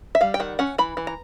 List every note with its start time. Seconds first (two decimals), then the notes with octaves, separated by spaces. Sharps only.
0.15 E5
0.21 G3 F5
0.34 G5
0.40 D#3 F#5
0.59 C#4 F#5
0.78 E3 B5
0.97 E3
1.07 A#5